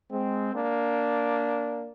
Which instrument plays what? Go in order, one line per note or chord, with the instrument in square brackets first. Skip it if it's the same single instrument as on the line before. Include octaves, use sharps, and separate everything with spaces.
[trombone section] G#3 C4
A#3 D4